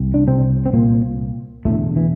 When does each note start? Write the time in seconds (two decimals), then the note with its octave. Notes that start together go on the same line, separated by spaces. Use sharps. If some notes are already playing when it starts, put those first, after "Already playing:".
Already playing: C2
0.14 D4
0.27 C3 C4
0.66 C4
0.73 A#2 A#3
1.65 E1 E2 A2 D3 A3
1.96 E3